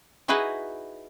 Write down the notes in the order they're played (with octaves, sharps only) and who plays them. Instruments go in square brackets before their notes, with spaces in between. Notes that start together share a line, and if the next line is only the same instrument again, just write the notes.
[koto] D#4 E4 F#4 G#4 B4 D#5